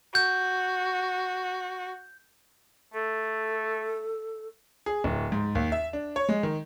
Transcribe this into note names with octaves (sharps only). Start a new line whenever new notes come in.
F#4 G6
A3 A4
G#4
D1
G#2
D#2
E5
D4
C#5
G#3
D#3